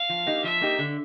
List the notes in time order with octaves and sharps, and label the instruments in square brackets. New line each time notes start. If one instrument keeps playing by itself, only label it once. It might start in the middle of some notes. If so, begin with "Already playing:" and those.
Already playing: [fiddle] F5
[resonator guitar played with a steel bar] F3
A#3 D#4 G4
[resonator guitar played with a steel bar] F3 [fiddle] E5
[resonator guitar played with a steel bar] A#3 D#4 G4
D3